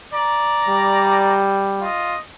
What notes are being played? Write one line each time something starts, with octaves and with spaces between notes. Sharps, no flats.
D5 A#5
G3
F4 D#5